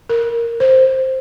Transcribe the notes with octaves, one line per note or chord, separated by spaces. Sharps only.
A#4
C5